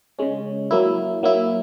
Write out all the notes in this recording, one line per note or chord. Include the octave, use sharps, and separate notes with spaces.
C#3 G#3 C#4
F#3 A#3 E4
F#3 A#3 E4